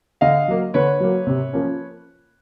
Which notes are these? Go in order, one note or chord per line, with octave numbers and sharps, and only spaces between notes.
D3 D#5 F5
F#3 A#3
D3 B4 C#5
F#3 A#3
C3
F3 A#3 C#4